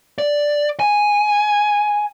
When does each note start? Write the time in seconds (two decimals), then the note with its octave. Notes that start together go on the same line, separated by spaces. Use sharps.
0.18 D5
0.80 G#5